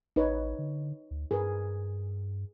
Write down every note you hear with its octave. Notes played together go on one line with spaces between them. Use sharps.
A1 D#4 B4 C#5
D3
D2
G2 G#4 A#4 B4